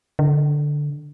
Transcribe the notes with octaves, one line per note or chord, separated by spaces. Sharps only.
D3